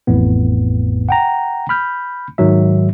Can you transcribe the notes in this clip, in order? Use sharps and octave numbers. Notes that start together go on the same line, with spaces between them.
A1 F2 A2 B3
F#5 G5 A#5
B5 F6 G6
G#2 D#3 F#3 E5